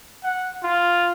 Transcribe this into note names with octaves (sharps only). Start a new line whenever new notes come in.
F#5
F4